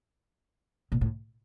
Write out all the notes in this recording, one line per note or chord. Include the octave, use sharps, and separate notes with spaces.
A#2
A2